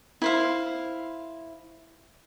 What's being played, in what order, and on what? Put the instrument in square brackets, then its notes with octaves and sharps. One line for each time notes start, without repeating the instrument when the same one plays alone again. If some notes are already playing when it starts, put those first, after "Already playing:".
[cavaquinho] E4 C5 F5